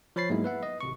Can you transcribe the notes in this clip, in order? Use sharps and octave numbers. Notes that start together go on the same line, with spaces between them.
F3 C#5 B5 A6 C7
G#2 F#3 G#3 A#3 B3 E4
B4 E5 F#5
D#5
G#1 C3 C#6